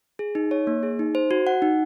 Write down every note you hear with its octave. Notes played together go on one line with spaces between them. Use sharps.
G#4
D#4
C#5
A#3
G#4
D#4
C5
F#4
F#5
D#4